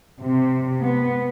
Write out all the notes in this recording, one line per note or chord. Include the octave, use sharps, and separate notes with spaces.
C3
B3